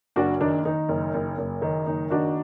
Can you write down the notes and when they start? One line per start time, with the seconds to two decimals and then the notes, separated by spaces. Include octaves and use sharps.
0.16 F#1 D4 F#4
0.40 D#3 D4
0.65 D#3 D#4
0.89 F#1
1.14 F#1
1.38 F#1
1.62 D#3
1.86 F#1 D#4
2.10 D#3 D4 F#4